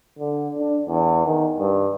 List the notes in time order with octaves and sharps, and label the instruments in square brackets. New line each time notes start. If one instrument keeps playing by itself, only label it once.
[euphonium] D3
D4
E2
D#3
G2